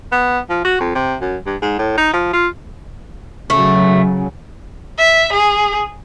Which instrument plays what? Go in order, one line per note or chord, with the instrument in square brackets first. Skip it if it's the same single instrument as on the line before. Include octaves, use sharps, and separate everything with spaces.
[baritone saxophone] B3
F3
F#4
F2
C3
F#2
G2
G#2
A2
D#4
F3
F4
[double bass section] C#3 F#3 [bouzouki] A3
[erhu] E5
G#4